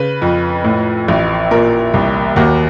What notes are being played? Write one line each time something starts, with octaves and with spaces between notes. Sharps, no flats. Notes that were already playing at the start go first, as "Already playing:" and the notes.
Already playing: C#3 B4
F2
A2
A1
A#2 A#4
C2
D#2 F#4